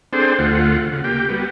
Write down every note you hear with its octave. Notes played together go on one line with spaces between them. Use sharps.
C4 D4 G#4 A4 C5 G5
D2 A3 F4 F#5
C#3
A#3 G4 G5
G3 B3 F#4